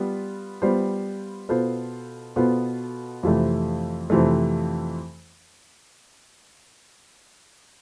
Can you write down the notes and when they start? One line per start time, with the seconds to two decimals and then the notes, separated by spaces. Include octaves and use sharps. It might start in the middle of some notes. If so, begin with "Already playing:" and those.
Already playing: G3 B3 F4
0.62 G3 B3 F4 C5
1.49 B2 B3 F4 A4 C5
2.36 B2 B3 F4 A4 C5
3.23 F2 C3 E3 A3
4.10 F2 C3 E3 A3